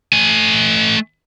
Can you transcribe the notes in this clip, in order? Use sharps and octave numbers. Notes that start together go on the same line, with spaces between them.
A3 G#5